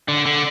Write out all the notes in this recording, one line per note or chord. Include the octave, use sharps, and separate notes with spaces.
D3
D3